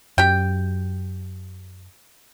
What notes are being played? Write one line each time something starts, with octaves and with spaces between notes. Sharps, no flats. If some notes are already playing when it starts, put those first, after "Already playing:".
F#2 F#3 G4 G5